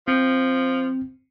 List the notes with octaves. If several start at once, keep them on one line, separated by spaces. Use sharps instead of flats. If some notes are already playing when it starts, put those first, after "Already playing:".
F3 C4